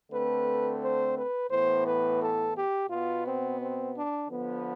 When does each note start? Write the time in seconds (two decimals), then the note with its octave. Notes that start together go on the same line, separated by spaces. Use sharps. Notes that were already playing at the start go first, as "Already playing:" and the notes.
0.12 D3 A3 C4 B4
0.81 C5
1.16 B4
1.50 A2 E3 B3 C5
1.86 B4
2.21 A4
2.56 G4
2.90 B2 B3 F4
3.25 C4
3.60 C4
3.95 D4
4.29 D3 F3 B3